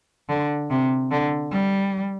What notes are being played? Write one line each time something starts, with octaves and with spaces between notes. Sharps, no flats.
D3
C3
D3
G3